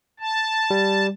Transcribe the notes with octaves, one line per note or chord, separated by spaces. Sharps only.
A5
G3